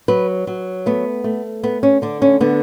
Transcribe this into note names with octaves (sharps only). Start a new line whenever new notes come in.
F#3 B4
F#3
A3 B3
A3
A3 B3
C#4
D3 D4
C#4
D3 B3